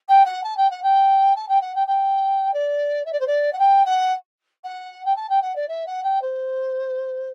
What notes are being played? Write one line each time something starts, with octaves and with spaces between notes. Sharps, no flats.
G5
F#5
A5
G5
F#5
G5
A5
G5
F#5
G5
G5
D5
E5
D5
C5
D5
F#5
G5
F#5
F#5
G5
A5
G5
F#5
D5
E5
F#5
G5
C5